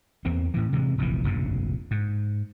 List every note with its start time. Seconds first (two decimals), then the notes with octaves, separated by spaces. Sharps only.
0.25 E2 E3 A#3 C4
0.54 A2 E3
0.73 C3 E3 G#3
0.98 F1 A#1 E2 E3
1.24 F1 A#1 G2 C#3
1.91 G#2